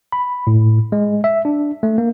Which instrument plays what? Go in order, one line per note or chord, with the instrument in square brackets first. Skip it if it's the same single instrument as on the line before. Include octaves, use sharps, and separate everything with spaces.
[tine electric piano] B5
A2
G#3
E5
D4
A3
A#3